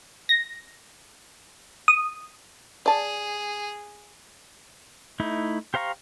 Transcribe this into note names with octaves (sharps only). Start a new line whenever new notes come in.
A#6
D#6
G#4 D5 A5
A3 D#4 E4
G4 C5 F5 A#5 C#6